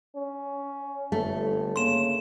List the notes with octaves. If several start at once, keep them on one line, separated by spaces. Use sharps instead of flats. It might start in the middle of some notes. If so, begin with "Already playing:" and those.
C#4
G1 A3
C#3 A#3 C6 E7